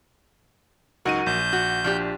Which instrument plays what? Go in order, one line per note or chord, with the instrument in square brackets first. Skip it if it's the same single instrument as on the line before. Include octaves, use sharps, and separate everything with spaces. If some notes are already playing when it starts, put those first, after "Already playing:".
[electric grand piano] C#2 D#4 D#7 [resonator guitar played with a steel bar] F#3 F#4 A#4
[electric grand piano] A#1 [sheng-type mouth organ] G6
[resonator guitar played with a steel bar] F#4
F3 D4 G4